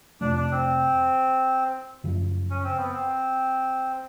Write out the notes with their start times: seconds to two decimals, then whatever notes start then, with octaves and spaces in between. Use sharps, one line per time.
0.21 F2 C3 F3 A3 D4
0.35 D4
0.52 C4
2.04 F#2 C#3 F3
2.50 C#4
2.64 C4
2.78 B3
2.91 C4